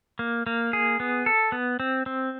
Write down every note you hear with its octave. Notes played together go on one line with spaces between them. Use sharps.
A#3
A#3
G#4
B3
A4
B3
C4
C4